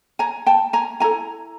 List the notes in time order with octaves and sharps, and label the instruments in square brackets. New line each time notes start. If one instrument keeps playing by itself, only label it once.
[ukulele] G#5 A#5
G5 A5
G#5 A#5
E4 A4 G#5 A#5